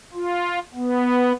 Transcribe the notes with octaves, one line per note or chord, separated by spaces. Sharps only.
F4
B3